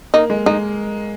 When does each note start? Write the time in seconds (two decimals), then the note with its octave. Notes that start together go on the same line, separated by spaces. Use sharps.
0.14 A#3 D#4
0.30 G#3
0.46 G#3 D#4